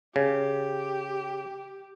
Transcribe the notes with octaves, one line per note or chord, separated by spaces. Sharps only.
C#3 G4